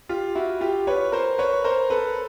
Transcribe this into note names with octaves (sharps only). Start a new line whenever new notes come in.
F4 G4
E4 F#4
F4 G4
B4 C#5
A#4 C5
B4 C#5
A#4 C5
A4 B4